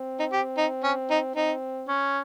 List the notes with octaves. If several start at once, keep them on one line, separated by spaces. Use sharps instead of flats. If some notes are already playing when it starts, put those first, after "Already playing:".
Already playing: C4
D#4
G4
D#4
C#4
D#4
C4 D#4
C#4